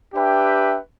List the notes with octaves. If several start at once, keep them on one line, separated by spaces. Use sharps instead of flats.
D4 G4 B4 E5 G5